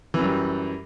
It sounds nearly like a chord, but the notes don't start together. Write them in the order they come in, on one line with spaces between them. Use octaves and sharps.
E3 F#2 G3